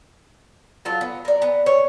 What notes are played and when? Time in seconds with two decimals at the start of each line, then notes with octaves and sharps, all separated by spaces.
0.85 F#3 F4 A4
1.01 B3
1.25 A#4 D5
1.42 B3
1.66 C#5